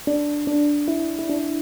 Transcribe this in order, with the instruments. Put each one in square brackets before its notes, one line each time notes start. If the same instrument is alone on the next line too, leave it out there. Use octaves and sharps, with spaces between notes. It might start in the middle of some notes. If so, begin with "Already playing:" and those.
[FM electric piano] D4
D4
E4
E4
D4